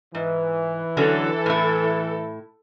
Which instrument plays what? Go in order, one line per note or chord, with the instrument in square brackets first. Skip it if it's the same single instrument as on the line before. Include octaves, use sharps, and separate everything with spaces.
[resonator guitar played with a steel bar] G#2 [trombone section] E3
[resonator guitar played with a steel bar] D3 F#3 C#4 [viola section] A4
[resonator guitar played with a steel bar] A2 E4